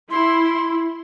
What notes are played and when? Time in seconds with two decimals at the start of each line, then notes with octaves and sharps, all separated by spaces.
0.11 E4 C6